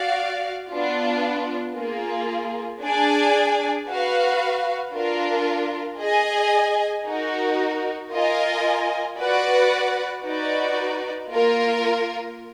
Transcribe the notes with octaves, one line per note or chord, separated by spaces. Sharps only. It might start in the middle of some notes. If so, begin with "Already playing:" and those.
Already playing: F#4 D5 F5
B3 D4 F4
A#3 F4 G#4
D4 G#4 D5 G#5
F#4 B4 F5
D4 F4 A#4
G#4 D#5 G#5
D#4 F#4 A#4
F4 A#4 D#5 G#5
F#4 B4 D5 F#5
D#4 F#4 B4 D5
A#3 F4 A#4